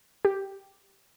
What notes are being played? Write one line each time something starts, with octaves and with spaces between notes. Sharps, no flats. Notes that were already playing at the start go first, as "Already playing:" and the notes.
G4